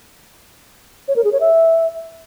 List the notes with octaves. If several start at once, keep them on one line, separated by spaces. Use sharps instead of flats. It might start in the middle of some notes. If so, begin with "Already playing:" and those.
C#5
A#4
G#4
C#5
E5